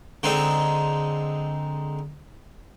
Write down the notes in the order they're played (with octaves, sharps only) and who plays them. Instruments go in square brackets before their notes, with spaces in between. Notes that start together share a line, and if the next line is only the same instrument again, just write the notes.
[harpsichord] D3 G#3 C4 D#4